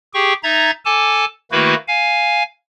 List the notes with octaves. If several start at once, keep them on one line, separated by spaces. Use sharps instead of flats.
G4 G#4 G5 C#6
D#4 E5 A#5 G#6 A6
A4 G#5 A5 D6
D#3 A3 A#3 E4 F#4 B4
F5 G#5